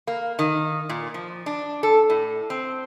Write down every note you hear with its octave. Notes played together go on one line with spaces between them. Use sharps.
A#3
D#3
A#2
F3
D4
A4
A2
C4